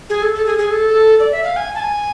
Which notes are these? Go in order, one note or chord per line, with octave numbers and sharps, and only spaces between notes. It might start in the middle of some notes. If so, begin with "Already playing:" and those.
G#4
A4
A4
G#4
G#4
A4
D5
E5
F5
G#5
A5
G#5